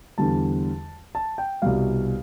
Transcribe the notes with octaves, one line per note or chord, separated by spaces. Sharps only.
E2 D3 G3 A5
A5
G5
C2 B2 G3 F5